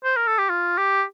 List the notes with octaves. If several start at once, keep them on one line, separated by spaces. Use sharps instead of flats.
C5
A#4
A4
G4
F4
G4